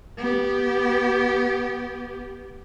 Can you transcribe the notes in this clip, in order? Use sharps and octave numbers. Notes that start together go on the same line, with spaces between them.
B3 G4